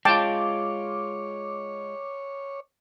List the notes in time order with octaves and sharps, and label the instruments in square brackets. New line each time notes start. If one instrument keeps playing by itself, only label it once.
[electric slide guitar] G#3 F4 [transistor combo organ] C#5 [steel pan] G5 A5 [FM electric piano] D6